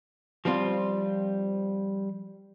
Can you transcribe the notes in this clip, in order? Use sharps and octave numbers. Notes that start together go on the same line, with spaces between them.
F3 G3 C4 F4